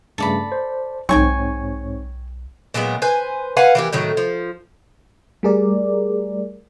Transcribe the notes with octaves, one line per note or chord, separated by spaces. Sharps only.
G2 C#3 A3 A4 D5 B5
C5
B1 G#2 C4 C#5 G5 G#5 C#6
A#2 F#3 G#3 B3
B4 C5 G#5
B4 F5 F#5 G#5
E3 A#3 G4
A2 D#3 F#3
F3
G3 A3 G#4 A#4 D5